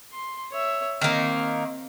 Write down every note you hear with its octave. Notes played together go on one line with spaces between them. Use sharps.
C6
C#5 E5
D#3 A#3 C4